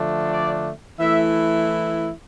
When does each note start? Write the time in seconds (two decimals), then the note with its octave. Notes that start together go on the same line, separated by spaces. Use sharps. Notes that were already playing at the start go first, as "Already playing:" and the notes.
Already playing: D3 F3 A3 D4
0.30 D5
0.99 E3 A3 E4 E5